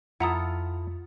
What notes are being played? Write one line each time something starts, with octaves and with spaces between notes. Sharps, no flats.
F2 E4 F4 A4 F#5 A#5 D#6